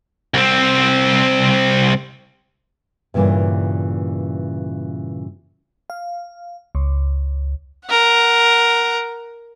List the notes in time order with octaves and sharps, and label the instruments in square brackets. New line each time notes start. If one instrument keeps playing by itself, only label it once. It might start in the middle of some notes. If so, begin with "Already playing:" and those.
[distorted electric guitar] C2 C4
[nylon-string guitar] G2 A#2 C#3 E3 A#3
[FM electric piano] F5
C#2
[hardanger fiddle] A#4 F#5